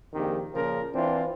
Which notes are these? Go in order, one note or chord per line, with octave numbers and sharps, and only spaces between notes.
A#1 F2 D#3 G4
A#2 C#3 F3 A#4
E3 C4 D4 F4